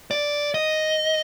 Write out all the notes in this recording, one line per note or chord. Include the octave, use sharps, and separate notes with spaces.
D5
D#5